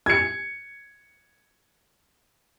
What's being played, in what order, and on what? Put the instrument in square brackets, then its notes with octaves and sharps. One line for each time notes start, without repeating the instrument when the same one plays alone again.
[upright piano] G#6 C#7